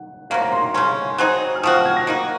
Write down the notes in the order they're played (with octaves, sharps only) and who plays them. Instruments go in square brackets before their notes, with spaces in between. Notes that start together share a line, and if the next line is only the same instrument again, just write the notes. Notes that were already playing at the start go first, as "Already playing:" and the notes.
Already playing: [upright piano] F#5
[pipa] C3 F#3 A#3 [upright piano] F5
[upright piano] A#5
C6
C6
[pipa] C#3 G#3 C#4 [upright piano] C6
[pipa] F#3 C4 D#4 G#4
[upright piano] F6
[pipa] F3 C4 F#4 [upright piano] D#6
[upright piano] F6
G#6
A#6
[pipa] A#3 D#4 F#4